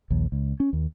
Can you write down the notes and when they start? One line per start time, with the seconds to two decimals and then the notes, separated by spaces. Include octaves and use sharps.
0.10 A#1 D#2
0.32 C#2
0.60 C#4
0.73 D#2